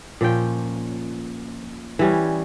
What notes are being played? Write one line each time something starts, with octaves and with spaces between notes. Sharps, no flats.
A#2 F3 C#4 G5
E3 G3 C#4